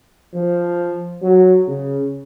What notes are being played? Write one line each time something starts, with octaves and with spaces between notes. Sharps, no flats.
F3
F#3
C#3